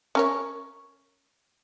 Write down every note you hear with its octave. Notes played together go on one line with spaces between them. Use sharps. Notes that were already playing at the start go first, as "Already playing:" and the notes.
C#4 A#4 C#5